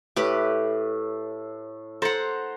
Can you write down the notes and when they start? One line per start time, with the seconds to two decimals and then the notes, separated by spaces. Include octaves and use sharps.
0.16 A2 G4 B4
2.02 A4 C5 F#5 A#5